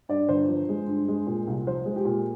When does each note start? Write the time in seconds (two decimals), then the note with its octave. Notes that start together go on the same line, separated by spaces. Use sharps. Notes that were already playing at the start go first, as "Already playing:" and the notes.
0.09 G2 D5
0.29 G1 C5
0.48 F3
0.69 G#3
0.87 G2
1.08 G#3
1.27 A#2
1.47 C2
1.67 F3 C5
1.86 G#3
1.96 G4
2.05 A#2